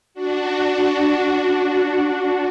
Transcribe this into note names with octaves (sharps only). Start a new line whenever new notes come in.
D4 F#4